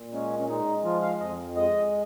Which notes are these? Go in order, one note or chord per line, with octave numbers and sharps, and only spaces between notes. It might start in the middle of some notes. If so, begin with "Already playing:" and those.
Already playing: A#2
G#3 C#4
C#4
G#3 D#4
F3 F4
F5
F2 D#5
G#3 D#5